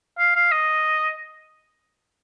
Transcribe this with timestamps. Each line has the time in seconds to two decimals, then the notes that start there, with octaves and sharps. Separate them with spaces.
0.19 F5
0.35 F5
0.52 D#5